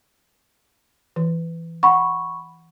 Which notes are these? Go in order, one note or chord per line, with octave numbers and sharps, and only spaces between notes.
E3
F#5 B5 C#6